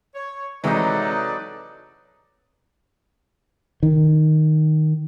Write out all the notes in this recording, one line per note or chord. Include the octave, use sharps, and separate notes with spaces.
C#5
C3 E3 F#3 G#3 D#4 A4 B4 D5
D#3